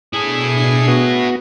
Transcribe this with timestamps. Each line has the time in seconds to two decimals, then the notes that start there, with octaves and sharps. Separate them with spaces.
0.14 B2 D4 E4 G#4 A4 C7
0.88 B3 F#4